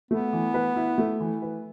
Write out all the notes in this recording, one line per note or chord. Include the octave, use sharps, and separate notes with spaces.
A3 B3
E3
B4
E4
A3
E3
B4